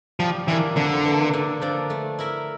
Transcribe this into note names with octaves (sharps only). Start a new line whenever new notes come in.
F3 G3
E3 A#3 D4 F4
F2 D3
E3 A#3
D3
F3 A#3 D4 A4
A3
E4 A#4 E5